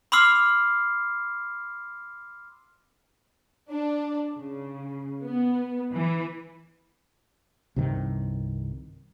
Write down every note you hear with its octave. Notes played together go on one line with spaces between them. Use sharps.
B5 C6 D6 E6 F6 C7
D4
C#3
B3
E3
C2 G2 C3 D#3